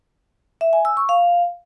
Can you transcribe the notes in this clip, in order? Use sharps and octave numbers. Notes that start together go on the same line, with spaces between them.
E5
G#5
E6
C#6
F5